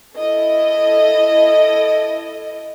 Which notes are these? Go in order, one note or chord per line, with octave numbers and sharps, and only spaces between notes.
E4 A4 D#5